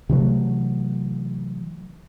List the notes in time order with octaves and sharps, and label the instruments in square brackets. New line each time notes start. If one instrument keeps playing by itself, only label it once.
[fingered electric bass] C3 E3 F#3 A3